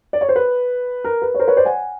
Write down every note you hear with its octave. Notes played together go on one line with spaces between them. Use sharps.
D5
C#5
C5
B4
A#4
B4
C#5
A#4 C5
B4 C#5
C5 D5
F#5 G#5